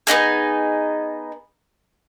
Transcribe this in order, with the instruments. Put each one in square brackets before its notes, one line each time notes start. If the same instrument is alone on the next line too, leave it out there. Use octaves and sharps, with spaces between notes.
[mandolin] B3 C#4 D#4 G#4